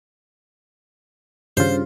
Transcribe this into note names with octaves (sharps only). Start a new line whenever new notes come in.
G2 C#3 F4 C5